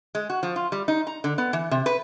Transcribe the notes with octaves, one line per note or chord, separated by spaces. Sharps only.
G#3
F#4
F3
F4
G3
D#4
A#5
D3
B3
E3
C3
B4